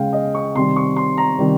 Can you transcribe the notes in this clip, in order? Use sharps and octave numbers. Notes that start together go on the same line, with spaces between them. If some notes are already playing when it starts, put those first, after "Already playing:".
Already playing: C#3 G#3 F5 G5
D#5
C#6
C3 D#3 G3 C6
C#6
C6
A#5
C3 D#3 G3